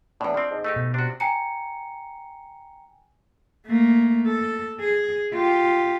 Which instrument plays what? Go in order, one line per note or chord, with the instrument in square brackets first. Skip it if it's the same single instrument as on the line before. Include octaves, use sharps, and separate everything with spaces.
[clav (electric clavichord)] E2 A2 [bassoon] D4
[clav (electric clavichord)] F3 C4
[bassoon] G#2
[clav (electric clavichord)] A3 D#4 G4
[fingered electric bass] B2
[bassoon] C3 [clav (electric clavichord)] D4 F#4
[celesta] G5 G#5 A#5 C#7
[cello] A3 A#3
A4
G#4
F4 G4